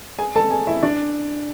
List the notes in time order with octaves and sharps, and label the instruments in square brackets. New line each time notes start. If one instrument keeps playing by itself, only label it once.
[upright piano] G#4 G#5
A4 A5
G#4 G#5
E4 E5
D4 D5